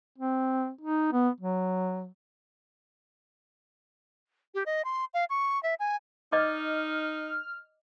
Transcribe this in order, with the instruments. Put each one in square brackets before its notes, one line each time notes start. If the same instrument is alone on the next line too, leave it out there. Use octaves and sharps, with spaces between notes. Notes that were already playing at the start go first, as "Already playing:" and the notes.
[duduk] C4
D#4
B3
F#3
[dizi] G4
D#5
C6
F5
C#6
E5
G#5
[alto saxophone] D#4 [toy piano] D5 D#5 D6 [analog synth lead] F6